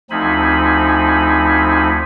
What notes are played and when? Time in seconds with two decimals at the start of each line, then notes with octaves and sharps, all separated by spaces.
0.11 D2 F3 C4 D#4 G#5 B5